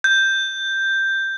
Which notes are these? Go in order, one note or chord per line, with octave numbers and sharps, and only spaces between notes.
G6